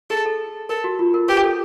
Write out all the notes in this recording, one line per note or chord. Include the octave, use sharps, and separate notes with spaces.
G#4 A4
A4
A4 A#4
F#4
F4
A#4
G4 B4
A4